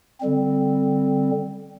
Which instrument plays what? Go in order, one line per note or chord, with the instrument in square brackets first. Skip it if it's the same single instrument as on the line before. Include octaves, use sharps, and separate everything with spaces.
[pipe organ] D3 G3 C4